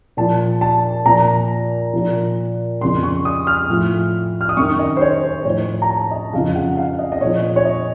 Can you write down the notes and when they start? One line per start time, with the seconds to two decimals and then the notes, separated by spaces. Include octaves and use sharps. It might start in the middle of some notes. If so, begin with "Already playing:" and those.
0.17 A#2 F3 A5
0.61 A5
1.05 A#2 F3 A#5
1.93 A#2 F3
2.81 F2 C#3 F3 C6
3.03 C#6
3.25 D#6
3.47 F6
3.69 A2 F3
4.41 F6
4.49 D#6
4.57 F#2 D#3 C#6
4.79 D#5
4.97 C5
5.01 C#5
5.23 C5
5.45 A2 F3 C#5
5.82 A#5
5.89 A5
6.11 D#5
6.33 F2 C#3 F3 F5
6.55 F#5
6.77 F5
6.99 D#5
7.12 D#5
7.21 A#2 F3 C#5
7.56 C#5
7.65 D#5